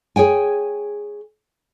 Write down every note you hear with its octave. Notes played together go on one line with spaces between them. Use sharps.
G#4 C#5 G5 G#5